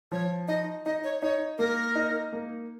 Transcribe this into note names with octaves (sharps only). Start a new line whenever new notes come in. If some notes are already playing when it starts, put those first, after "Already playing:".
F3 C#5
D#4 D#5
D#4 D#5
C#5
D#4 C#5
A#3 A#4
D#4
A#3